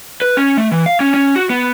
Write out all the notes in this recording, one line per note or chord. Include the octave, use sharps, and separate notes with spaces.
B4
C#4
A3
E3
F5
C#4
C#4
F#4
B3